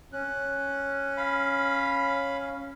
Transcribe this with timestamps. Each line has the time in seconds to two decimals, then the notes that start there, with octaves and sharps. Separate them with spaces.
0.13 C#4 F#6
1.17 F5 B5